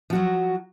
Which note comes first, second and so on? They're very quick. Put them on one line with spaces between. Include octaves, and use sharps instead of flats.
F3 F#4 F#3